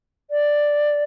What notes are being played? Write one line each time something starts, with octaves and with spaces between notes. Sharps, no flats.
D5